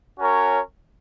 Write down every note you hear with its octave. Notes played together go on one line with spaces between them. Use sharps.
C#4 F#4 A#4 C#5